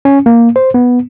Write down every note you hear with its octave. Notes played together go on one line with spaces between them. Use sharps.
C#4
A#3
C5
B3